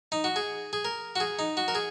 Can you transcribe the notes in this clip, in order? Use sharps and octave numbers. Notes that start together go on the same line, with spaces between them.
D#4
F#4
G#4
G#4
A#4
F#4
G#4
D#4
F#4
A#4
G#4